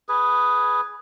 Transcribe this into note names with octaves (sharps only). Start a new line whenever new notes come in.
G#4 B4